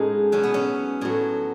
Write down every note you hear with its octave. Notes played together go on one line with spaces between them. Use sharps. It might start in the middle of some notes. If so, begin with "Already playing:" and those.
Already playing: A2 G#3 C#4 D#4 F#4
B2 F#3 C#4
B3
C#4
A2 F#3